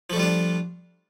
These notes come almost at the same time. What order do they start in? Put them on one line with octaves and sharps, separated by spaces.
F3 A3 G3 F4 D4